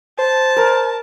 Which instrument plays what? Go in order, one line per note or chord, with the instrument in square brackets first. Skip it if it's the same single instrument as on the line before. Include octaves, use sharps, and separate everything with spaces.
[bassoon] C5 [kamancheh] A5
[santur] A#4